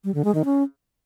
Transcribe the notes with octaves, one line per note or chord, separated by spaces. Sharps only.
G3
D3
G#3
D#3
C#4